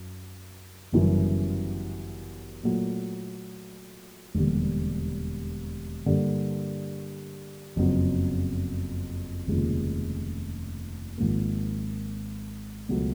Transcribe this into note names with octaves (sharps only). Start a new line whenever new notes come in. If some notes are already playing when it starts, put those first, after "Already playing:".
Already playing: F#2
G1 F#2 C#3 E3 G3
A#2 F#3 A3
E1 D#2 D3 G3
G2 D3 G3 A#3 D4
F#1 F2 C#3 F#3 B3
F1 D#2 C#3 F3 G#3
G#1 G#2 F3 A#3
C#2 B2 F#3 A3